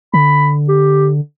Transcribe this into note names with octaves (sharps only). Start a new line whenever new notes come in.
D3 B5
G4